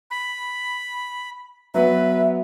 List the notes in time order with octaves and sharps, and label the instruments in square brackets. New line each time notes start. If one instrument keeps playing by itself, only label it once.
[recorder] B5
[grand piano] F#3 B3 [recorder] B4 [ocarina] E5